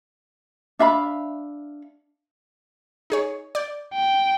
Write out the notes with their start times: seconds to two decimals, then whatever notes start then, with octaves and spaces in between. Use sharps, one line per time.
0.79 D4 E5 F5 B5
3.10 D#4 G#4 C#5
3.55 D5 G6
3.93 G5